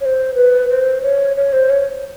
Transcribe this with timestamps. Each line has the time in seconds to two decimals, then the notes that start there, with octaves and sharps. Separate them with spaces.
0.01 C#5
0.05 C5
0.35 B4
0.69 C5
1.03 C#5
1.37 C#5
1.53 C5
1.70 C#5